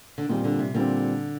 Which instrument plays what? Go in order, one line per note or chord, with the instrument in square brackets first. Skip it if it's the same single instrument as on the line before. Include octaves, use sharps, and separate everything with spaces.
[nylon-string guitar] D3
[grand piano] A#2 G3 C4 [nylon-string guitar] D#3
[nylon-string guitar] D3
C3
[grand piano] A#2 G3 C4 [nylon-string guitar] D3